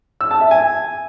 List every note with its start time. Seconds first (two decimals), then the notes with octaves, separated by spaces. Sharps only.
0.21 E6
0.31 A5
0.41 E5
0.51 G#5